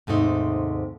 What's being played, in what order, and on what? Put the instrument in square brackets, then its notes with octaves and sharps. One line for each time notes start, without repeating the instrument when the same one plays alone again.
[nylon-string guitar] D#2 G#2 C3 A3 D#4